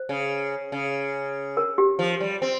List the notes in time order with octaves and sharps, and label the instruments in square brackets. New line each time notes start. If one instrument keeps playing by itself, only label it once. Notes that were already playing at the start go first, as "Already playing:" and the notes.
Already playing: [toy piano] C5
[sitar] C#3
C#3
[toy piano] A#4
G4
[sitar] F3
G3
C4